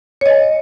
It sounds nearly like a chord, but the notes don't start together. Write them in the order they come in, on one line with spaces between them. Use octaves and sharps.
C#5 D#5 G#5